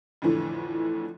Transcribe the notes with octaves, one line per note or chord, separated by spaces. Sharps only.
F2 A2 D3 E3